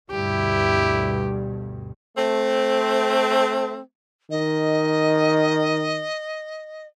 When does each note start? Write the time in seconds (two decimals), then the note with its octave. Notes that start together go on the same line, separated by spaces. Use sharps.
0.10 D2 G2 B2 E4 G4
2.18 A3 C4
4.30 D#3 D#5